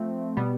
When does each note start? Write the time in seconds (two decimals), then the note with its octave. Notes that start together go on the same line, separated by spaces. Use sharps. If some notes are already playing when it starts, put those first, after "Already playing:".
Already playing: F3 A3 C4
0.37 B2 G3 B3